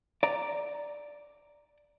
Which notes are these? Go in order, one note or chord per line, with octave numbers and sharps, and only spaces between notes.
D5 A#5